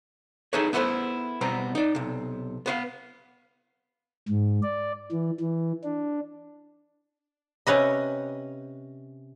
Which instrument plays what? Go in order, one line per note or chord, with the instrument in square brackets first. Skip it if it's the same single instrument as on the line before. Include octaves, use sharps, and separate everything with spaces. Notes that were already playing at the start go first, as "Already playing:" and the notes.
[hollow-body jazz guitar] D#4 E4 G#4 A4 B4 C#5
B3 E4 A4 B4 C5
B2 G3 B3 C4 A#5
D#4 D5
B1 C3
B3 B4 F5
[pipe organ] G#2
D5
E3
E3
D4
[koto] C3 C#4 B4 D#5